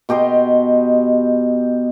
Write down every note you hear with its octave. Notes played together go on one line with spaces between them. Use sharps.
B2 G4 D#5 C6